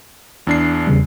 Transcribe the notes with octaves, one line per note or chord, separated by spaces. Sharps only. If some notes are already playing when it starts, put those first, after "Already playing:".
E2 D4 C7
E2 C#3 G3